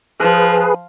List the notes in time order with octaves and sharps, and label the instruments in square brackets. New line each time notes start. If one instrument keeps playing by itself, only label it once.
[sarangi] F3 [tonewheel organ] G#4 B4